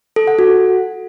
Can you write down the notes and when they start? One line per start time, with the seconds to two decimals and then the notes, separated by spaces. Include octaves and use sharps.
0.16 A4
0.27 F#5
0.39 F#4